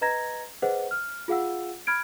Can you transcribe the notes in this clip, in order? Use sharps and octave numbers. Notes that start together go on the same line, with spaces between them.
B4 D#5 A#5 G#6 A#6
G#4 B4 C5 D#5 F#5
F6
F4 G#4 F5 F#5 E6
B5 F6 G#6 D7